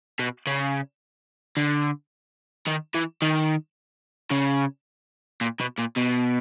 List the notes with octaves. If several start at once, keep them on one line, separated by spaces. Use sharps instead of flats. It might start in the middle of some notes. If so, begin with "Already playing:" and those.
B2
C#3
D3
D#3
E3
D#3
C#3
A#2
B2
A#2
B2